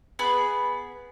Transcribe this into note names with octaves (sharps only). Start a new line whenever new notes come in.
B3 G#4 B5